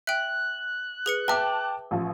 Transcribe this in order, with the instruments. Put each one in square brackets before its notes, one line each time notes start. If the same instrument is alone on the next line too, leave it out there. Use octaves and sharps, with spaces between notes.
[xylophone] E5 G5 [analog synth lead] F#6
[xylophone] G#4 B4 C#7
[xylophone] B4 E5 [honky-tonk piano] G5 A5 D6
[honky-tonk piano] A1 F3